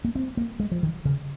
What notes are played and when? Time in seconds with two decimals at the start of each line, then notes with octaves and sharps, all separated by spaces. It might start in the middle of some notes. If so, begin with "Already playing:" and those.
0.04 A#3
0.15 C4
0.37 A#3
0.60 G#3
0.72 F3
0.83 D#3
1.05 C#3